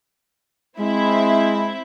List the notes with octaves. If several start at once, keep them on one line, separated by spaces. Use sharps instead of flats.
G#3 C4 E4 E5